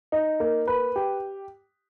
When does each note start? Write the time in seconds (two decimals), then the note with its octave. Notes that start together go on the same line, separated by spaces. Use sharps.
0.12 D#4
0.40 A#3
0.68 B4
0.96 G4